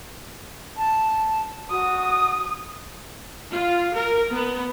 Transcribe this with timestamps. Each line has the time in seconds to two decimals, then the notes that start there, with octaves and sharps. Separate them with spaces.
0.77 A5
1.71 F#4 D#6
3.50 F4
3.95 A#4
4.31 B3